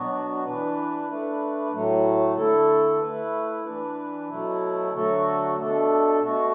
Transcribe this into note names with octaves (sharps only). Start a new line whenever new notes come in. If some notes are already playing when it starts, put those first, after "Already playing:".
Already playing: B2 F#3 B3 D4 F#4
E3 D4 B4
A3 D4 B4
A2 F#3 A3
D3 A3 E4 A4
A3 E4 B4
E3 D4 B4
B2 F#3 A3 E4
D3 F#3 A3 F#4 A4
B2 A3 D4 A4
B2 A3 F#4